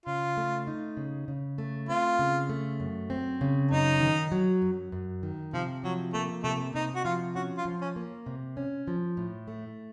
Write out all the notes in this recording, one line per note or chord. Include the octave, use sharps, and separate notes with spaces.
C#3 F4
A3
D#4
C#3
C#3
A3
C4 F4
C#3
A3
F#2
C4
C#3
F#2 D#4
D#3
F#3
F#2
F#2
D#3
C3 F3
F3 F#3
A3 A#3
C3 A3
C3 D#4
F#4
F3 F4
C#4 F#4
F4
F3
C#4
A#3
C3
C#4
F3
A2
A3